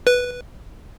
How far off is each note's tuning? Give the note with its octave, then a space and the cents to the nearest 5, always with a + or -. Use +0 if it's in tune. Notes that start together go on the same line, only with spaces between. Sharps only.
B4 -5